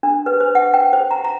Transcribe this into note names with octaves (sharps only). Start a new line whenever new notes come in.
D4
B4
C5
F#5
G5
C5
A#5
A#5